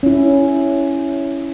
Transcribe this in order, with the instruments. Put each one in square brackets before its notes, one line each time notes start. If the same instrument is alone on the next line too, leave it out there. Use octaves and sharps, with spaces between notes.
[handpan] C#4 E4